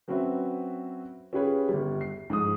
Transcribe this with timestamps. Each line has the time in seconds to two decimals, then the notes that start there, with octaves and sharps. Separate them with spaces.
0.08 F#3 C4 C#4 F#4 B4 E5
1.33 C#4 F4 G4 G#4 B4 C#5
1.69 G1 G3
2.01 C7
2.30 G#2 F3 D#6